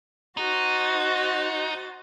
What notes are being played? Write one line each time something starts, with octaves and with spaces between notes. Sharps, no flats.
D#4 F#4 C5 A6